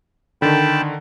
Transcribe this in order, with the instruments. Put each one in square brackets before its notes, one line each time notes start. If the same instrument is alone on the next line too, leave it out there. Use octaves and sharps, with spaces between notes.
[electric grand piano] D3 D#3 [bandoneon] G5 A5 B5